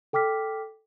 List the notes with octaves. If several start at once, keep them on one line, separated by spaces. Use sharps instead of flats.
A4 G5 D6 F6 B6